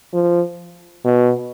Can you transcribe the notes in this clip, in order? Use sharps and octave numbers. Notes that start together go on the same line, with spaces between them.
F3
B2